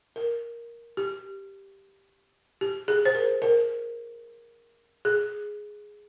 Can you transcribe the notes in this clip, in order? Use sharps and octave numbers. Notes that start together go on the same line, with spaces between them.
A#4
G4
G4
G#4
C5
A#4
A#4
G#4